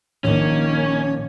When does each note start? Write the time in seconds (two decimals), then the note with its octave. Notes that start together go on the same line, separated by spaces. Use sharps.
0.24 A#1 D#3 A#3 C#4 C#5